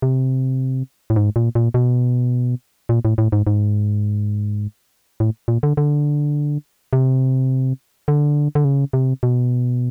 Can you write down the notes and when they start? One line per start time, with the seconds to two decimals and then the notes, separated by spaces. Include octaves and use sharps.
0.02 C3
1.10 A2
1.16 G#2
1.36 A#2
1.55 A#2
1.74 B2
2.89 A#2
3.05 A2
3.18 A2
3.32 G#2
3.47 G#2
5.20 A2
5.48 A#2
5.63 D3
5.77 D3
6.93 C3
8.08 D3
8.55 D3
8.65 C#3
8.93 C3
9.23 B2